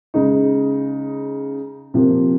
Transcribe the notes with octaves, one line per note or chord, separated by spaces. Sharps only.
C#3 G#3 D#4
C3 F3 A#3